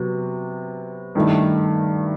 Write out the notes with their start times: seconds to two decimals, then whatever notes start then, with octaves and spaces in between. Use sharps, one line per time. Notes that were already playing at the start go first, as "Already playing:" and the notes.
Already playing: C3 F#3 B3
1.15 G2 D#3 A3 E4